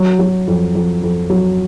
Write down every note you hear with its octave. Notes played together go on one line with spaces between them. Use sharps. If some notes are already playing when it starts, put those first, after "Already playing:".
Already playing: F#3
F#3
F2
F2
F2
F#3